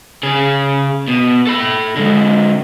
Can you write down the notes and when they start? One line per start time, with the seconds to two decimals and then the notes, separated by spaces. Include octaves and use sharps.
0.23 C#3 G#4
1.08 B2
1.47 A4 B5
1.96 D3 G#3